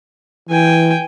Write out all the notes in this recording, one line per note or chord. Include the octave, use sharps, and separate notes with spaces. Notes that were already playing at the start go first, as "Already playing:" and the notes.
E3 G5 G#5